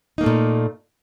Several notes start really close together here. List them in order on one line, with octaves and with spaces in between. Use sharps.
D#4 A#3 A3 A#2